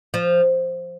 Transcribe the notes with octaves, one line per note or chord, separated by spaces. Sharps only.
F3